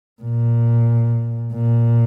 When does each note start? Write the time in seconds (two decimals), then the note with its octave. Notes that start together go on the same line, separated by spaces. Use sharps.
0.22 A#2
1.54 A#2